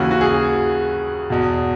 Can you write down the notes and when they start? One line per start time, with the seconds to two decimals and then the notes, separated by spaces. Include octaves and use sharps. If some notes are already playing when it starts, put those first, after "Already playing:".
Already playing: D#2 C#3 E3 F#4
0.11 F#4
0.21 G#4
1.30 E2 B2